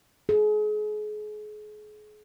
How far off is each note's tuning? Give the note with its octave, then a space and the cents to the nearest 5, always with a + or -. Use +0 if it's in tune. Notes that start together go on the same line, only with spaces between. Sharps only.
G#4 +35